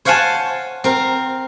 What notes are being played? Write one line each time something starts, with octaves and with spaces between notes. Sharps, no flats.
C5 C#5 F5 F#5 G#5 A5
C4 A#4